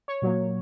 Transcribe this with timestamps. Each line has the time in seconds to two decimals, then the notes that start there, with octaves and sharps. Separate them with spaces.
0.08 C#5
0.22 A#2 F#3 A#3